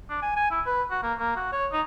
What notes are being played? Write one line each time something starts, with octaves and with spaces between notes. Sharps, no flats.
D4
G#5
G#5
E4
B4
F#4
A#3
A#3
F#4
C#5
D#4